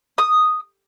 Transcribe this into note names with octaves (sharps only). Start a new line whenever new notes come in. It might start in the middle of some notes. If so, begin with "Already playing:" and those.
D#6